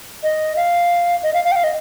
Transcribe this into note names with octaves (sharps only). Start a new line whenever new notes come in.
D#5
F5
D#5
F5
F5
G5
F5
D#5